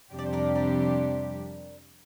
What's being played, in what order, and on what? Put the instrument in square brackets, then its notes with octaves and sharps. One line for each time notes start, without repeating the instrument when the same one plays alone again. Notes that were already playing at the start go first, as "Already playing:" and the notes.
[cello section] F2 C3 G3 D4 G4
[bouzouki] D5
C5
A#4 D5
A#4 D5